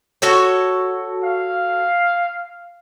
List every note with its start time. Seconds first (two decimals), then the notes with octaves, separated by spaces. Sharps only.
0.22 F#4 A4 C#5
1.24 F5